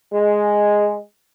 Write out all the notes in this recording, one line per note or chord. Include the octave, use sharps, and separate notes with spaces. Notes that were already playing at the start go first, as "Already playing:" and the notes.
G#3